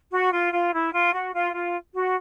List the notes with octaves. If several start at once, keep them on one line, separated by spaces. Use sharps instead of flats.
F#4
F4
F4
E4
F4
F#4
F4
F4
F#4